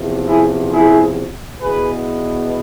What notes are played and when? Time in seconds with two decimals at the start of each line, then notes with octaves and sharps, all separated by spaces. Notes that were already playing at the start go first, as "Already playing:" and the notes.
Already playing: E2 C3 F3
0.27 E4 G#4
0.71 E4 G#4
1.61 E2 B2 B3 G#4 B4